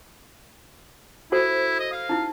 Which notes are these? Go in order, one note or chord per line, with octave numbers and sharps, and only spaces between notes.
E4 F#4 A4 C5
D#5
F5
D#4 E4